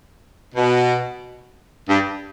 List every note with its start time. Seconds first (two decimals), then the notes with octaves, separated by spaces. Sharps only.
0.55 B2
1.88 G2